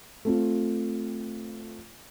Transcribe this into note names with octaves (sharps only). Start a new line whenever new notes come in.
A3 C4 F4